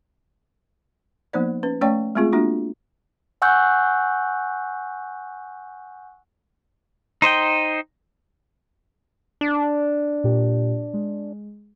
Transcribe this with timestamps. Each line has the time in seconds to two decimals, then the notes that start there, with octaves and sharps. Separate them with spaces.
1.33 F3 A#3 B3 D#4 C5 D5
1.63 C#4 B4
1.81 A3 C#4 C#5 D5 G5 C#6
2.15 G#3 A3 C4 F4 G#4
2.32 G#3 A#3 D4 F4 F#4
3.42 F#5 G#5 C#6 E6 F#6 G6
7.22 D#4 C5 D#5 G5
9.41 D4
10.24 A#2 G4
10.94 G#3